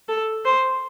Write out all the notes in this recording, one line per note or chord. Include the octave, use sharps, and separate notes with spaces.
A4
C5